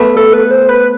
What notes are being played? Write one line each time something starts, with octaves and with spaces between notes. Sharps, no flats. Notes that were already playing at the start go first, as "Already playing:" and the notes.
Already playing: A3 B3
A4
B4
C5
B4